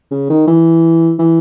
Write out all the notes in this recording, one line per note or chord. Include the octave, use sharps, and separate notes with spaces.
C#3
D#3
E3
E3